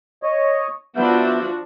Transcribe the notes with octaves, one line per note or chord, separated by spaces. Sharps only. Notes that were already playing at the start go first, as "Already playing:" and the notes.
C#5 D#5
F3 B3 D4 F#4 E5 G6